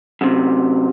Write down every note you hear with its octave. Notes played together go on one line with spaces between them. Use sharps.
F#2 C3